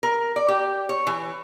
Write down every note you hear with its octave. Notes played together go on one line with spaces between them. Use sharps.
A#4
D5
G4
C#5
E3